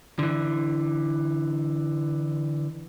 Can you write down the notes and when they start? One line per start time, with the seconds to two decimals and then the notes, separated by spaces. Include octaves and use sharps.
0.19 D3 E3